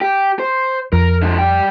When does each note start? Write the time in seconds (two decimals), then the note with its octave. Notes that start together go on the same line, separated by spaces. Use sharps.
0.01 G4
0.39 C5
0.93 F2 A#4
1.22 D3 F3
1.39 G3 G5